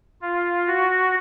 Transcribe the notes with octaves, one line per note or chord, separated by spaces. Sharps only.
F4
F#4